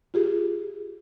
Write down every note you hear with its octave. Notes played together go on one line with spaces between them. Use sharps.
F4 G4 G#4